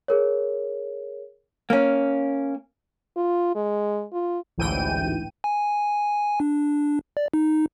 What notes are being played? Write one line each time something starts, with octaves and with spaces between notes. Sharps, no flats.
G#4 A#4 C#5
A#3 C#4
F4
G#3
F4
A1 D2 G#2 E3 G5 D#7
G#5
D4
D5
D#4